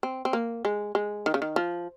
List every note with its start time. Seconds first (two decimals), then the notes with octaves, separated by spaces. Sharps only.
0.03 C4
0.25 C4
0.33 A#3
0.65 G#3
0.95 G#3
1.26 D#3
1.34 C#3
1.42 D#3
1.56 F3